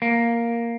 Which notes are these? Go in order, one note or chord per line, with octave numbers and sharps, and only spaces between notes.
A#3